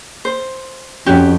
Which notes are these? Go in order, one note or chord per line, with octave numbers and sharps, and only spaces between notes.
C5
F2 C#4 F#4 G4